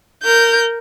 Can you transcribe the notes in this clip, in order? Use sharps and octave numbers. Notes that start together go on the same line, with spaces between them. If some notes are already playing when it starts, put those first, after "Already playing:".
A#4 G6